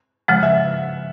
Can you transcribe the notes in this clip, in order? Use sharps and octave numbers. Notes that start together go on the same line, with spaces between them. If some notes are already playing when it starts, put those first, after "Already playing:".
C#3 F3 G#3 F#5
E5